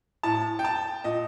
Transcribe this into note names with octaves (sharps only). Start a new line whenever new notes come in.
A2 A5
G5
A5
A#2 D#5